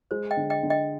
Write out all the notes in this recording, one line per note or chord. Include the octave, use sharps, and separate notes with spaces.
G#3 C5
D#5 G5
D3
D#5 G5
D3
D#5 G5